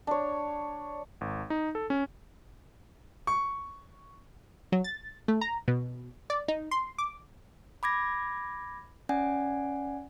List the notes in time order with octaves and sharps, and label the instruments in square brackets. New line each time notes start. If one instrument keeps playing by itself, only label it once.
[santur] D4 C#5
[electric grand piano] G#1
D#4
A4
C#4
[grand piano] C#6
[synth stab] F#3
A6
A3
A#5
B2
D5
D#4
C6
D6
[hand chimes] B5 D6 G#6 A#6
C#4 D5 F#5 G#5